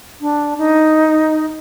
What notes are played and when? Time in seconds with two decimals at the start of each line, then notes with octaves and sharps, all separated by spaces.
0.21 D4
0.58 D#4